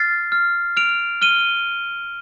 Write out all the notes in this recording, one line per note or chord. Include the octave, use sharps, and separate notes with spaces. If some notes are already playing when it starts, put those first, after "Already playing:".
Already playing: F6 A6 C7
F6
F6 D7 F7
F6 D#7 G7